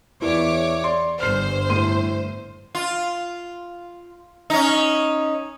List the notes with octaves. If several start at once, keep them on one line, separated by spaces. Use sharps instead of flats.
E2 E4 B4 C#5 D5 D6
D5 C6
G1 C5 F6 C7
A2 C6 D#7
F4
C#4 D#4